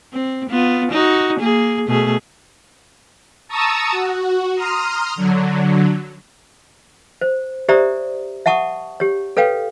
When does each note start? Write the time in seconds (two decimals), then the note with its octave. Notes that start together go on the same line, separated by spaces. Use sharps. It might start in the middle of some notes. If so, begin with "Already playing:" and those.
0.13 C4
0.49 B3 F4
0.92 D#4 F#4
1.40 A#3 G#4
1.87 B2 A3 G#4
3.48 A5 A#5 C#6 D#6 E6
3.91 F#4
4.55 A#5 C6 D#6 F6
5.16 D3 F#3
7.21 C5
7.69 G4 C5 D5 E5 A#5 D#6
8.46 E5 F#5 A5 C#6 D#6
9.00 G4 C#5
9.37 A4 B4 C#5 F5 G5